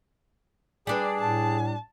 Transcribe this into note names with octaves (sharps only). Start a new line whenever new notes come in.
G3 D4 G#4 B4 D5
A2 A5